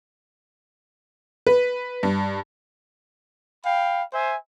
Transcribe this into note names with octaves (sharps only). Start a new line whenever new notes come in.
B4
G2
F5 G5 B5
C5 E5 G#5